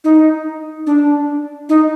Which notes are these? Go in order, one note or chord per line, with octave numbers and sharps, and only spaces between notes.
D#4
D4
D#4